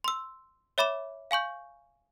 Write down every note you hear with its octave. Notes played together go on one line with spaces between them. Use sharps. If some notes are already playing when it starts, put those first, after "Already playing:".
C6 E6
C#5 E5 B5 D6 E7
F5 G#5 C#6 G6